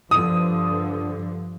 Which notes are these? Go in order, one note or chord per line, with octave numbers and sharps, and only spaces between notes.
G2 D3 F3 D#6